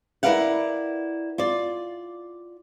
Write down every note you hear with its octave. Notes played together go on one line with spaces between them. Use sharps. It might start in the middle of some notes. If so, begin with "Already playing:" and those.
E4 A#4 B4 D5 F5 F#5
F4 D5